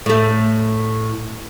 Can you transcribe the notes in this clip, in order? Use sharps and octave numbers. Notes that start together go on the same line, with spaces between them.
A2 A3